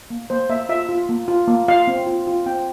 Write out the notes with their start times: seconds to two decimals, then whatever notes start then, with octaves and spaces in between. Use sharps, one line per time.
0.10 A#3
0.30 A#3 C5
0.49 A#3 E5
0.69 F4 E5
0.89 F4
1.09 A#3
1.28 F4
1.48 A#3
1.68 F4 F5
1.88 C4
2.07 F4
2.27 F4
2.46 C4 G5